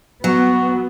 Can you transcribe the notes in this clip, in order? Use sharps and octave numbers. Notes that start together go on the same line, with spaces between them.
F#3 B3 F#4